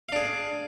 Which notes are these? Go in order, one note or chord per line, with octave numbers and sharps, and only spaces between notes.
D4 G#4 F5